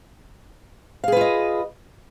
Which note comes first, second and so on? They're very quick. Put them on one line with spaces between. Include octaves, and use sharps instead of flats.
F5 G#4 B4 F4 D#5